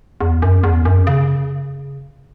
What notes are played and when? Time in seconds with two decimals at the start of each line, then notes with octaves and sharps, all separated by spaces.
0.21 E2
0.42 F#2
0.64 E2
0.85 F#2
1.07 C#3